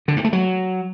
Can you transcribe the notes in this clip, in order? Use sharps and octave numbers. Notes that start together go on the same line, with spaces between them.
D3
G2
A3
F#3